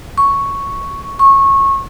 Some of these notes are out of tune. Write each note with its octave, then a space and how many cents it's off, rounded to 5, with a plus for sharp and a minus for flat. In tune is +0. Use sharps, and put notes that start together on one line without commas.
C#6 +0
C#6 -20